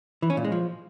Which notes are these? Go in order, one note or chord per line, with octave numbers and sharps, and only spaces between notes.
E3
C#4
A#2
G#3
F3